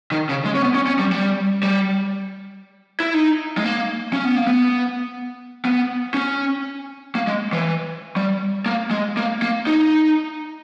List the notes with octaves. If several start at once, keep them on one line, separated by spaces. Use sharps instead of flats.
D#3
C#3
G#3
C#4
B3
C#4
C#4
G3
G3
G3
E4
D#4
G#3
A#3
C#4
B3
A#3
B3
B3
C#4
A#3
G#3
E3
G3
A#3
G#3
A#3
A#3
D#4